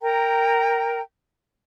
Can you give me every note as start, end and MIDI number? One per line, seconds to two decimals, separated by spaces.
0.01 1.01 70
0.01 1.01 79
0.01 1.01 82